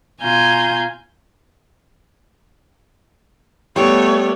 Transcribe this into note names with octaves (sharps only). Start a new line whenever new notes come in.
B2 F4 G#5 A#5 G6
G3 A3 B3 G4 C#5